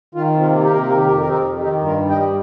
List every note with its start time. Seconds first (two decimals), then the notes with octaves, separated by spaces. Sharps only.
0.15 D#3 F4
0.33 C3
0.40 F4
0.52 A#3
0.64 G4
0.69 C3 A#4
0.80 G4
0.88 D#3 A#4
0.97 G4
1.04 F2 A#4
1.12 G4
1.20 A#4
1.25 C4 D#4 G4
1.43 F2
1.61 D#3 D#4 G4
1.79 G2
1.85 F4 A#4
1.98 G3
2.10 D#5 G5
2.16 G2